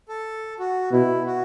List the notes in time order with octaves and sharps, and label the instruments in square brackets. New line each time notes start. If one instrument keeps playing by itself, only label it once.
[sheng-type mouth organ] A4
F#4
[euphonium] B2 [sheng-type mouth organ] E4
[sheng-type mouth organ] F#4